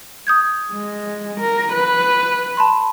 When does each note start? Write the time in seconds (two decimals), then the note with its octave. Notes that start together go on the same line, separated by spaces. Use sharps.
0.27 D#6 G6 G#6
0.73 G#3
1.40 A#4
1.72 B4
2.57 A5 B5 C6